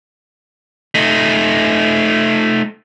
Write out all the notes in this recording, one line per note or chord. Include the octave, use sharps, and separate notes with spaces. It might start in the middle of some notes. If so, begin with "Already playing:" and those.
A3 D#4